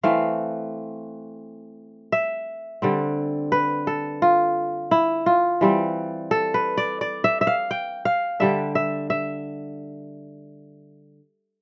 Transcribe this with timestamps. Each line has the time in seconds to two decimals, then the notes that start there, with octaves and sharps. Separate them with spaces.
0.03 E3 A3 C4 F5
2.12 E5
2.82 D3 G3 C4
3.52 B4
3.87 A4
4.22 F4
4.91 E4
5.26 F4
5.61 E3 G3 C4
6.31 A4
6.54 B4
6.78 D5
7.01 D5
7.24 E5
7.41 E5
7.47 F5
7.71 G5
8.05 F5
8.40 D3 G3 D4 E5
8.75 E5
9.10 E5